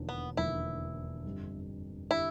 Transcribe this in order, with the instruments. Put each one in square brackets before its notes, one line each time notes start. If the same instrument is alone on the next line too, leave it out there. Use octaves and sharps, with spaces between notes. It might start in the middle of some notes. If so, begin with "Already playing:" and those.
Already playing: [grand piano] E1 D#2 D3 F3
[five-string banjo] B3
[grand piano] E1 D#2 D3 F3 [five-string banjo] E4
[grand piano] G1 F2 D3 G3
[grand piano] D3 G3 [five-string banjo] E4